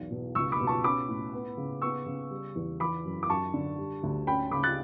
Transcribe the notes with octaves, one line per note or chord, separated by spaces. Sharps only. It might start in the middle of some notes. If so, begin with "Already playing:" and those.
Already playing: B1 E2
B2
C#2 C#6 E6
B5 D6
B2
A5 C#6
C#4 B5 D6
A2
B3
C#3
B3 C#6 E6
C#3
G3
E2
E3 B5 D6
F#2
D6
F#2 A5 C#6
D3
G3
D2
C#4 G5 B5
C#3 B5 D6
F#6 A6